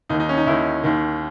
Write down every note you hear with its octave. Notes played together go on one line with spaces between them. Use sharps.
D#2 D#3 D#4
D#4
C#4
D#4
D#2 D#3 E4
D#2 D#3